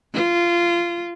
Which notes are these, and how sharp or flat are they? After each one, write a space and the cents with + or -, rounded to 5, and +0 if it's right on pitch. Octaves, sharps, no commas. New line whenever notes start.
F4 -20